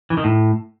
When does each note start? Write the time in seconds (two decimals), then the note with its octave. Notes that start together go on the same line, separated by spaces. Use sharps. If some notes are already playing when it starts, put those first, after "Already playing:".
0.10 E3
0.17 D#3
0.24 A2